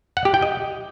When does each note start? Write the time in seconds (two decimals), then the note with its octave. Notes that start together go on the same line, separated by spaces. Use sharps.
0.17 F#5
0.25 G4
0.34 G5
0.42 D#5